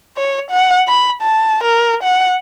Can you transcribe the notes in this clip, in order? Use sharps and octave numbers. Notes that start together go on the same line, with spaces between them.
C#5
F#5
B5
A5
A#4
F#5